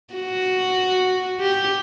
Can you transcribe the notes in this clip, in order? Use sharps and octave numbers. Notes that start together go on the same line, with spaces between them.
F#4
G4